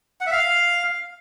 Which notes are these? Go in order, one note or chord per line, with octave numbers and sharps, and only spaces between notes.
F#5
E5
F5